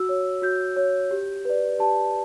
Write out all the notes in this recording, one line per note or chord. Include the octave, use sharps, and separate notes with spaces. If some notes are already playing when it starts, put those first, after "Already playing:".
Already playing: F#4 E6
C#5
F#4 G6
C#5
G4
B4 D5
G4 A5